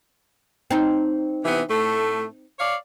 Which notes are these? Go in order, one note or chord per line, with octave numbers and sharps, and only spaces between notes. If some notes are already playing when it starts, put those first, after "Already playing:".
C4 D#4
C3 E3 B3
A2 A3
C#5 D5 F5